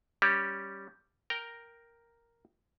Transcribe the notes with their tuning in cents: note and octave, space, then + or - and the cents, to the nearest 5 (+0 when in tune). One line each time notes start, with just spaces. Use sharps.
G3 +0 C#4 +0 G4 +0
A#4 +0 G5 +0 A#5 +0